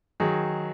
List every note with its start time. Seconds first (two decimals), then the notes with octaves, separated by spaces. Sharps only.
0.20 D#3 F#3 G#4